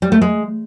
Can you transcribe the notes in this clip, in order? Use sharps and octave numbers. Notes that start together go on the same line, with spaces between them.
G3
A3
G#3